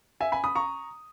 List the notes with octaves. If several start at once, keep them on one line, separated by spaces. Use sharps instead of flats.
E5 G#5
G#5 B5
B5 D#6
A#5 C#6